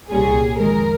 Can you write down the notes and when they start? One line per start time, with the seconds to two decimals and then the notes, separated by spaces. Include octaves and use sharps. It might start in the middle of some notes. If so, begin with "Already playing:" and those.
0.11 C2 A#2 G3 C#4 G#4
0.59 F2 D#3 G#3 A#4